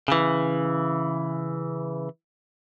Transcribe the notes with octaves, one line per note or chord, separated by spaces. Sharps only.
C#3 E3